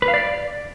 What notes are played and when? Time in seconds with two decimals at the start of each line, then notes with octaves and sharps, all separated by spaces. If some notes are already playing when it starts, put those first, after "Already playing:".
0.02 B4
0.08 F5
0.14 D5